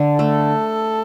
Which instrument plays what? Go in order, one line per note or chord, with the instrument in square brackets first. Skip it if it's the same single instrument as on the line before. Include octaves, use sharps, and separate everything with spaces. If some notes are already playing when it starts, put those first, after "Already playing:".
Already playing: [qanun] D3
[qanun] A3 [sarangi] A4